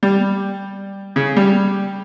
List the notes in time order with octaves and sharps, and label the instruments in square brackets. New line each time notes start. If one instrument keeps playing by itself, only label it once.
[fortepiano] G3
C#3
G3